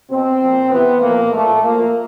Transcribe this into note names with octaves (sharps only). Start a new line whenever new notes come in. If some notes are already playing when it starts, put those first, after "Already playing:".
B2 C4
A#2 F3
C3 E3 B3
A#2 F3 A#3
A#2 F3 A3
A#2 F3 A#3